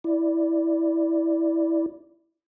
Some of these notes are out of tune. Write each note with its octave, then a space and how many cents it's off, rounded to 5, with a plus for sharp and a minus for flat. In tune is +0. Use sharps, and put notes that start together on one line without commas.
E4 -5 D5 +0